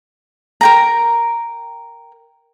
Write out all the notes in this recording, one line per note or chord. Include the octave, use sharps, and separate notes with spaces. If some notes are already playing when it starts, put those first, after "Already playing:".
A#4 G5 A#5